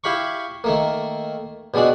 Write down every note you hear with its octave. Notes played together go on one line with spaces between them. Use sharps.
E4 G4 F5 B5 C#6
D#3 A3 A#3
B2 G3 G#3 D4 F#4